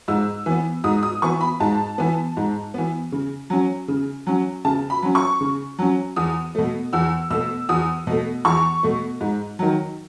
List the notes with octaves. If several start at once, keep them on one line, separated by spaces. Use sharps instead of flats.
G#2 E6
E3 B3
G#2 D#6
D#6
E3 B3 C#6
B5
G#2 A5
E3 B3
G#2
E3 B3
C#3
F#3 C#4
C#3
F#3 C#4
C#3 A5
B5
F#3 C#4
C#6
C#3
F#3 C#4
E2 D#6
B2 A3
E2 E6
B2 A3 E6
E2 D#6
B2 A3
E2 C#6
B2 A3
G#2
D#3 F#3